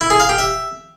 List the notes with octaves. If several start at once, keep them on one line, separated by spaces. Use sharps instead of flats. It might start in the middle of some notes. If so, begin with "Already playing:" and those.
E4
G#4
F5
G4
E5